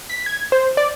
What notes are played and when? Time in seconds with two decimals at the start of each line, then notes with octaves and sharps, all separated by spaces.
0.10 B6
0.26 G#6
0.52 C5
0.77 D5